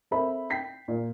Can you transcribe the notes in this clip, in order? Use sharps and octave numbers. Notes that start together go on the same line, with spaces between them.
C4 A4 A#4 C5 E5 B5
G5 B6 C7
A#2